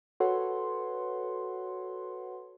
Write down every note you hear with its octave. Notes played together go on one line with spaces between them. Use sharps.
F#4 A4 B4 C#5 F#5 C6